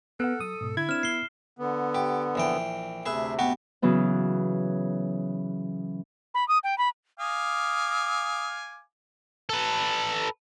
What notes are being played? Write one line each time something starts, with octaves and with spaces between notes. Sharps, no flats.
B3 A4 F#5 F6 F#6
F#3 D#6
G#2 B2
D3 E4 G#6
C4 D4 F6 E7
B3 C7 G7
D3 B3
G4
A#1 E3 G5
D2 C3 G#4 B4 E5
B3 F#4 G4
C#3 E3 F#3 B3
B5
D#6
G5
B5
F5 G#5 D6 D#6
A4 B4